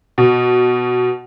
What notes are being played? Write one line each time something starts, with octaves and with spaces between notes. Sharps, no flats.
B2